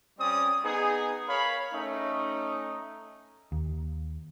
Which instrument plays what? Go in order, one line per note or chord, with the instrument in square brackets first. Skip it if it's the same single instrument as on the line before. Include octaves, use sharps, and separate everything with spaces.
[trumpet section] G3 C4 C#4 D5 D#6
B3 D#4 G#4
A#4 C#5 F5 B5
A3 C#4 D#4
[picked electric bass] D#2